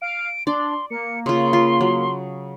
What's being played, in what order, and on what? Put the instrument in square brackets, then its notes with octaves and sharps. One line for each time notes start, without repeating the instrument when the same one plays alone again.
[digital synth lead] F5 [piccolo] D7
[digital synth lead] D4 [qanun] D5 [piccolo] C6
[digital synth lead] A#3 [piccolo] C#7
[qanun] C#3 F4 [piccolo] C6
[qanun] F4
F#3